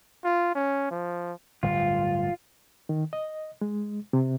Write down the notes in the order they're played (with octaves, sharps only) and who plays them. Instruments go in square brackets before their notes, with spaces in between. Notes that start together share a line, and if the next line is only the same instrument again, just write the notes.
[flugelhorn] F4
C#4
F3
[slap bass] D1 G1 G3 [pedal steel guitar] F4
[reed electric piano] D#3
D#5
G#3
C3